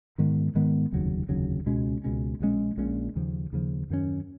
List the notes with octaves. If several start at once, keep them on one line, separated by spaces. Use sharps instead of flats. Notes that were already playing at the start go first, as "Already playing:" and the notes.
G#2 D#3 G#3 B3
G#2 D#3 G#3 B3
F1 D#2 C#3 F#3
F1 D#2 C#3 F#3
C#2 B2 G#3 C#4
C#2 B2 G#3 C#4
A#1 A#2 G#3 C#4
A#1 A#2 G#3 C#4
D#2 C#3 F3
D#2 C#3 F3
F#2 D#3 A#3 C#4